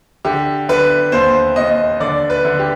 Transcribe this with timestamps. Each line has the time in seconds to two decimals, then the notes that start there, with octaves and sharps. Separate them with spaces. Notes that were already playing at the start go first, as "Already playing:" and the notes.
0.25 D3 G4
0.69 D3 B4
1.12 D#2 C5
1.56 D#2 D#5
2.00 D3 D5
2.30 B4
2.45 D3
2.59 G4